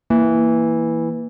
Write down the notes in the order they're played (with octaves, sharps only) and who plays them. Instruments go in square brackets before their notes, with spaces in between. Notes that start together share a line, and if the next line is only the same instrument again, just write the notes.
[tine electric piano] E3 [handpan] A#3